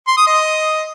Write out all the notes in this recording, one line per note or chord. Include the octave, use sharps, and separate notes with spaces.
C6
D#6
D#5